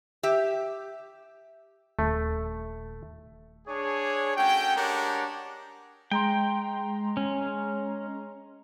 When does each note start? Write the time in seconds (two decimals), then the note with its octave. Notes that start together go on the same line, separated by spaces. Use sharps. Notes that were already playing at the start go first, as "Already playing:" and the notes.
0.23 G4 E5
1.99 D#1 A3
3.67 D4 G#4 C#5
4.37 A3 C#4 F#4 G5
4.76 G#3 D4 G4 A#4 C#5 F#5
6.12 G#3 G5 A#5 C6
7.17 C#4